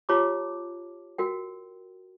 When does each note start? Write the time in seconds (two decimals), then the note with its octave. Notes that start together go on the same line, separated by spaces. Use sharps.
0.09 F4 G4 C#5 A5 B5 D6
1.18 F#4 A#4 G5